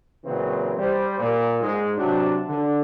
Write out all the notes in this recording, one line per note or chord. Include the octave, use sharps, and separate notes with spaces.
A#2 C#3 E3 F#3 C4 F4
G3 C5
A#2
G#2 G#3
C3 F#3 D4
D3